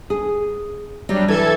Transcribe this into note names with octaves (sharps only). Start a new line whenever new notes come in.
G#4
F#3 G3 D4
E3 A4 A5 G#6